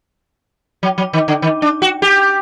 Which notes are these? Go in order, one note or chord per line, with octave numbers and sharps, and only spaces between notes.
F#3
F#3
D#3
D3
D#3
D4
F#4
G4